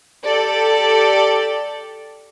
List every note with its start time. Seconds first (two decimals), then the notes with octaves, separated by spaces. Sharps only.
0.23 G4 A4 D5